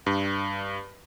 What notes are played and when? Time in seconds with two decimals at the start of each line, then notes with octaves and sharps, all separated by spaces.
0.06 G2